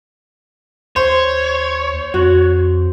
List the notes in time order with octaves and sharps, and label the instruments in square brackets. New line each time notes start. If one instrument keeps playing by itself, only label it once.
[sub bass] D#2 [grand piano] C5 [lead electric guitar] C#5
[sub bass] F2 [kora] F#4